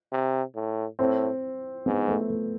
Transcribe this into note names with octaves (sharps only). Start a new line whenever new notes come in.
C3
A2
A2 C4
G#2 B3
A3
A3